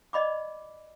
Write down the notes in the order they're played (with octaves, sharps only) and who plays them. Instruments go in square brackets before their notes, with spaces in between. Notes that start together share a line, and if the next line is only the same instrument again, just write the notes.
[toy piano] D5 D#5 B5 D6